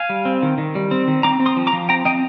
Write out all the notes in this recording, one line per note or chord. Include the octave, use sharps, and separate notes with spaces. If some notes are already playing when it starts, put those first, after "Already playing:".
Already playing: F5 G#5
G3
C4
D#3
D#3
G3
C4
D#3
C4 A#5 D6
C4
C6 D#6
F3
A#5 D6
F3
C4 G5 A#5
C4 D#5 G5